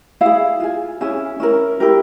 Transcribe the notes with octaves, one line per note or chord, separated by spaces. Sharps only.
E4 G#4 F5
F4 G#4
C#4 E4 G#4
C#4 E4 A#4
E4 G4 A#4